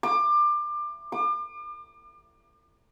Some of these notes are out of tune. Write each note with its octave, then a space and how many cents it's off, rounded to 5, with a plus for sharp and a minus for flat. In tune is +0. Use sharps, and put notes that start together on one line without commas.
D6 +25
D6 +40